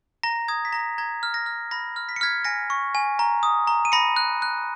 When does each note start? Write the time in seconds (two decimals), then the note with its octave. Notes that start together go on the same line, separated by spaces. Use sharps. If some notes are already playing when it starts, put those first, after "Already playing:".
0.23 A#5 A#6
0.48 D#6 G#6
0.65 B6
0.73 A#5 A#6
0.98 A#5 G#6
1.23 F6
1.34 A#6
1.46 F6
1.71 B5 A#6
1.96 F6
2.09 B6
2.16 C#7
2.21 F6 G#6 B6
2.45 G#5 A#6 C#7
2.70 C#6
2.95 G#5
3.19 A#5
3.43 D#6
3.67 A#5
3.85 D#7
3.92 B5 A#6 C#7
4.16 F#6
4.42 F#6